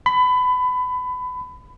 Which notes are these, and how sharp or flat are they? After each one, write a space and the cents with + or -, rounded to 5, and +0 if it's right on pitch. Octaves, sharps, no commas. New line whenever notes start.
B5 +25